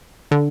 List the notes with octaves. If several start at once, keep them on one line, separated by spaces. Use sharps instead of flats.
D3